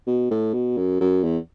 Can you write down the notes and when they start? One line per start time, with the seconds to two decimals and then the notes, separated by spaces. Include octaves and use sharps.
0.07 B2
0.31 A2
0.53 B2
0.77 F#2
1.01 F#2
1.23 E2